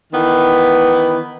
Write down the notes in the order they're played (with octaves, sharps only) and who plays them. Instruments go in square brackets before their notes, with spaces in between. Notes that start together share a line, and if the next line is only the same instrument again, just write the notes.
[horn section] D#3 E3 B3